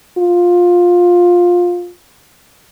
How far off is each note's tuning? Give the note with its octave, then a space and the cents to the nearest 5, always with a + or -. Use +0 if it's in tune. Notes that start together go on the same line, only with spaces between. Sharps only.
F4 +15